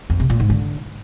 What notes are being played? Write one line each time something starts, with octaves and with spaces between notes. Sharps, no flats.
F2
C3
A#2
G#2
D3